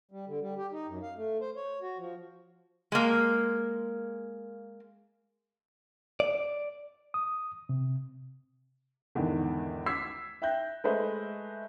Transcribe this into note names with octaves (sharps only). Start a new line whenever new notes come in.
G3
D3
G3
G4
D#4
F#2
F5
A3
C5
C#5
F#4
F3
G#3 A#3
D5
D#6
C3
E2 G#2 D3 D#3
D6 E6 G#6 B6 C7
E5 G5 F#6 G6 A#6
G#3 A3 B4 C5 D#5